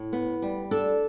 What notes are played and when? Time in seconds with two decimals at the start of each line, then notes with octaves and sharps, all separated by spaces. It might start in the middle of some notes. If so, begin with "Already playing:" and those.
Already playing: A2
0.13 B3
0.42 G3
0.71 D4 A4